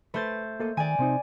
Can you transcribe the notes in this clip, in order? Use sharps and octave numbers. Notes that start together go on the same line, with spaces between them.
A3 B4 C5 A6
A#3 A4 D#5
D#3 D5 G#5
C3 C4 D#4